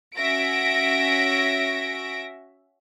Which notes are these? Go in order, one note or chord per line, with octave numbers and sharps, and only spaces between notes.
C#4 F#4 E5 A#6 D7